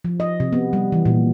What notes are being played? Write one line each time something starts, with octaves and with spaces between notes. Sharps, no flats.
F3
D#5
C3
B3
G3
E3
A#2